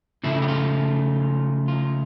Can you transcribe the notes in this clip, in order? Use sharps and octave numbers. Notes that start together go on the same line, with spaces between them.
C#3 F3 A3 E4
G4
F4
F4